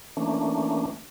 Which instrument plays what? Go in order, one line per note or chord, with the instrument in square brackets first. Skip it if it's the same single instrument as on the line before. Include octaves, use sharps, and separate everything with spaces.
[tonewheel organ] E3 A3 A#3 C#4 D4